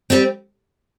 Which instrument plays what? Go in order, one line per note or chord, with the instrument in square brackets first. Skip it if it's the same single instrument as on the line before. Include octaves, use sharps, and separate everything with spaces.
[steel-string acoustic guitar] G3 C4